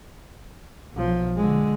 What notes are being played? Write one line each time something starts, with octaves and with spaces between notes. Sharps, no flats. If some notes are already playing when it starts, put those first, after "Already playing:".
B1 F3
D3 G#3